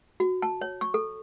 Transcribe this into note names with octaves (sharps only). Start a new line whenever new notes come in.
F#4
A5
C#5
C#6
A4